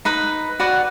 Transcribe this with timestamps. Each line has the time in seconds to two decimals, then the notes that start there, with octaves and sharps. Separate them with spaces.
0.05 D#4 B4 D#6
0.60 F#4 B4 D5 F#5